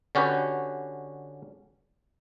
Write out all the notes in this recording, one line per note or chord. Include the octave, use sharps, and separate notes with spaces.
D3 C#4 F#4 G4 B4